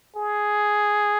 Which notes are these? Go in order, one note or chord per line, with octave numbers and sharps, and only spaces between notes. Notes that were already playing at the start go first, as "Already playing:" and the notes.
G#4